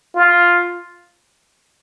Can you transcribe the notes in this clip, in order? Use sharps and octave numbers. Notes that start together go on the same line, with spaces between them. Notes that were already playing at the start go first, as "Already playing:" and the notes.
F4